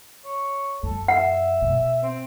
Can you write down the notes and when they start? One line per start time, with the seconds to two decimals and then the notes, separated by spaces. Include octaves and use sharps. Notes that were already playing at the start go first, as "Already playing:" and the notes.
0.25 C#5
0.83 F#2 A4
1.08 E5 F#5
1.62 B2
2.03 C4